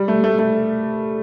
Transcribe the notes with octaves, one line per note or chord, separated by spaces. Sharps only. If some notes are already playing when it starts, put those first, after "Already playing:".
Already playing: G3
A3
A3
A3